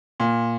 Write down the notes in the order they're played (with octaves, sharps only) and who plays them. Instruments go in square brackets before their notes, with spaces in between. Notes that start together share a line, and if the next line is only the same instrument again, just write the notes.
[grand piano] A#2